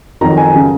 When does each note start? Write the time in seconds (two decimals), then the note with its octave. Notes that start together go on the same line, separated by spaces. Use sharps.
0.21 F2 D#3 F#3 A#5
0.37 G#5
0.54 C#3 F#3